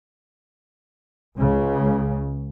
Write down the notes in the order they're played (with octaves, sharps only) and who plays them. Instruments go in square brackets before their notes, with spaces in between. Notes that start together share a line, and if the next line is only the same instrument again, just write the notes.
[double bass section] C#2 C#3